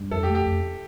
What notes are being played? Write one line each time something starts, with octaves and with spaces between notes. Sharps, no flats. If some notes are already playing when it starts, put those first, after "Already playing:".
Already playing: G2
F2 A4
G4
A3
G4
F2